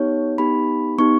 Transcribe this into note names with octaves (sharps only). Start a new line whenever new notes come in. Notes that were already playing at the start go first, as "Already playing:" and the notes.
Already playing: B3 D#4 G4 C#5
B3 D#4 G4 B5
B3 D#4 G4 C#6